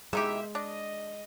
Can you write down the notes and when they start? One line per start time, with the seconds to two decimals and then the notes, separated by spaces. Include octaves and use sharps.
0.13 B2 E3 G#3 A#3 D#4 G4 E5
0.55 D4 D#5